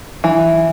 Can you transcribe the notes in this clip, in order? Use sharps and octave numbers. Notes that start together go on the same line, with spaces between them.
E3